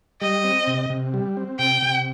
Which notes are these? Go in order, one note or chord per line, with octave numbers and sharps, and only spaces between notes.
G3 D#5
C4
C3
C3
G3
C4
C3 G5
C3